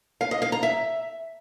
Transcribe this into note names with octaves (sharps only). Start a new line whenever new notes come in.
F5
D#5
F5
A#5
E5